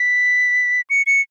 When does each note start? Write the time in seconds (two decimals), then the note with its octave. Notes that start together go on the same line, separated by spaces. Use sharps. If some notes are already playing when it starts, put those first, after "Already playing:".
Already playing: B6
0.90 C#7
1.06 C#7